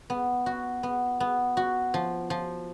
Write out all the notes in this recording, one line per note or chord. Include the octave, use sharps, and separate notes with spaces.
B3
F#4
B3
B3
F#4
F3
F3